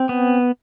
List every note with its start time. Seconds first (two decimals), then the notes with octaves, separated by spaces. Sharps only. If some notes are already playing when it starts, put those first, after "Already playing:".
Already playing: C4
0.09 B3